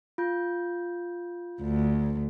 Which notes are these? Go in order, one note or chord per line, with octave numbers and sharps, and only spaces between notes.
F4 G6
D2